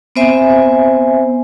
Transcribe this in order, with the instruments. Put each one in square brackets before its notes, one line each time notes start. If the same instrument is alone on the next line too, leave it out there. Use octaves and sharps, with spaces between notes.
[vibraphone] B3 C4 C5 E5 G#5